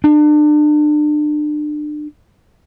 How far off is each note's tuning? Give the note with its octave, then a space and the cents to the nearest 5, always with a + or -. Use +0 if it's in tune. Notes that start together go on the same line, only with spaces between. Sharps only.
D4 +35